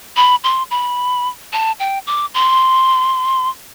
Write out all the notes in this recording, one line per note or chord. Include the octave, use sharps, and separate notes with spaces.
B5
C6
B5
A5
G5
D6
C6